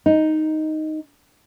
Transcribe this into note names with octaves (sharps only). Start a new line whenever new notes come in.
D#4